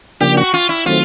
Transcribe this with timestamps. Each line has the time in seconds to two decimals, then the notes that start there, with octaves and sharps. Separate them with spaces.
0.20 C#3 F3 A#3 D4 G4
0.37 F#4
0.54 F4
0.69 E4
0.86 D#3 F#3 A3 C4 F4